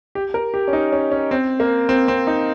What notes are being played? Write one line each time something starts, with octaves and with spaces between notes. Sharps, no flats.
G4
A#4
G4
C#4
D#4
C#4
C#4
C4
A#3
C4
C4
D#4